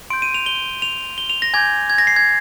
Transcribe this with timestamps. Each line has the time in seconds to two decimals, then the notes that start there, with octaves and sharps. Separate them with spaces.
0.10 C6 G6 D7
0.22 D#7
0.34 F7
0.46 G7
0.82 F7
1.18 G7
1.30 F7
1.42 A#6
1.53 G#5 D6 G6 G#6
1.90 G#6
1.98 A#6
2.07 C7
2.16 G#6